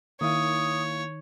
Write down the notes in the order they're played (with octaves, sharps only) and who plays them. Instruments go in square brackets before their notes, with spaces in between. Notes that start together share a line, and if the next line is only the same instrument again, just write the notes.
[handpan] D#3 [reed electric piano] A#3 E4 F5 [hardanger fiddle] C#5 [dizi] D#6